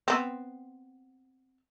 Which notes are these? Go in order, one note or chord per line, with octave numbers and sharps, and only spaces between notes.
B3 C4